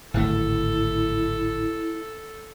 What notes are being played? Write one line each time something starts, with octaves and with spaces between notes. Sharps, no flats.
D1 G#1 A3 E4 A4